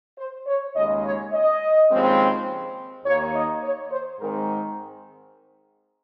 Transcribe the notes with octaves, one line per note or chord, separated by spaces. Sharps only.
C5
C#5
D#2 C#3 G#3 D#5
C#5
D#5
D#2 C#3 F3 G#3 C4
D#2 D#3 A#3 C#5
D#5
C#5
C5
G#2 D#3 G#3 C4 A#4